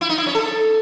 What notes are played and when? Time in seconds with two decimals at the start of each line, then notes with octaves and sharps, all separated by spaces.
0.01 E4
0.09 D#4
0.18 E4
0.26 C#4
0.35 A4